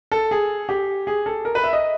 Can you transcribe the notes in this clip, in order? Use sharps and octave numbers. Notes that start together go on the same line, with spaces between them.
A4
G#4
G4
G#4
A4
A#4
B4
E5
D#5